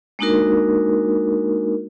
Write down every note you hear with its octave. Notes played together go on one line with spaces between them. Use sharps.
G#3 A#3 D4 D#4 F#4 A#4